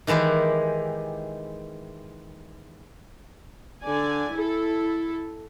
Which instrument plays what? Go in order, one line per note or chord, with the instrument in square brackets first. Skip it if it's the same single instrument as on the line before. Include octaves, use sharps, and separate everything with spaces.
[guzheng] D#3 E3 G#3 E4 G4
[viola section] D3 D5 G#5
E4 A4